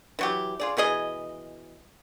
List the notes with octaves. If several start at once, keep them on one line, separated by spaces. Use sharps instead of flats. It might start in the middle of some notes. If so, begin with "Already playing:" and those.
E3 F#3 G4
F4 G#4 D5
B2 E3 G#4 D#5